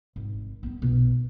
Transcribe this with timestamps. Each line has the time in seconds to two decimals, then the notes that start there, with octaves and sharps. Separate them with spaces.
0.16 G#1
0.63 B3 E4
0.82 B1 B2